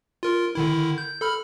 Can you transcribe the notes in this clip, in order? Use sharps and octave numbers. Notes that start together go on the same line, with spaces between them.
F4 A#4
D3 D#3 E4
G6
A4 B5 F6